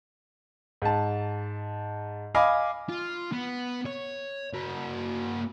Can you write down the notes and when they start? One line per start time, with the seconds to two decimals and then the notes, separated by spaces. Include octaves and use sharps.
0.82 G#2 A5
2.35 D#5 F5 G#5 B5 D6
2.89 F4
3.32 B3
3.86 C#5
4.54 A#3 F#4